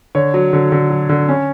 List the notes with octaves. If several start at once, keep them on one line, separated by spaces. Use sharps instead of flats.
D3 C#5
F#3
D3
D3
F#3
D3
C#4